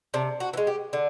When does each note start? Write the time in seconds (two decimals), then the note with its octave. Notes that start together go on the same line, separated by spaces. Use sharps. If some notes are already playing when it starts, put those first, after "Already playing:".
0.14 C3 D4
0.40 F#4
0.53 E3
0.57 G#3
0.67 G4
0.93 D3